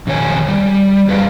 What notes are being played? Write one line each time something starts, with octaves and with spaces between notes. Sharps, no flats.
F2 D#3 C#5 G#5
G3
F2 G#4 B4 D5 F5